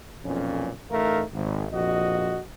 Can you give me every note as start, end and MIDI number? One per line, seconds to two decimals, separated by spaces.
0.24 0.70 35
0.24 0.70 41
0.24 0.70 46
0.24 0.70 61
0.91 1.23 33
0.91 1.23 57
0.91 1.23 63
0.91 1.23 70
0.91 1.23 77
1.34 1.66 32
1.73 2.40 34
1.73 2.40 41
1.73 2.40 66
1.73 2.40 75